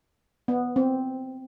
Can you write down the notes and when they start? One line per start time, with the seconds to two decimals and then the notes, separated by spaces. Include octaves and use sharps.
0.48 B3
0.76 C4